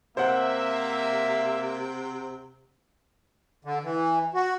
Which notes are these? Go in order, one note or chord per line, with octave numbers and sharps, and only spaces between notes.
C3 A#3 C5 E5 F#5
D3
E3
F#4